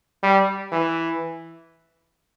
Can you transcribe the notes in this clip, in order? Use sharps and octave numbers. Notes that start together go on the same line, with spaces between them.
G3
E3